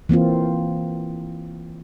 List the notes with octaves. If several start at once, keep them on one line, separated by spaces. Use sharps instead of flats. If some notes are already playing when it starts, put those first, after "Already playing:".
E3 A#3 C4 F4